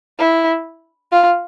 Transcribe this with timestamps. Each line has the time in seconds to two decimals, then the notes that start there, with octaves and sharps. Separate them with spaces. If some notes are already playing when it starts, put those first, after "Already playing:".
0.19 E4
1.12 F4